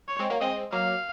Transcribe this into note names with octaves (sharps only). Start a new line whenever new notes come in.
C#5
G#3 C4
F#3 A#3
G#3 C4 D#5
F#3 A#3 F5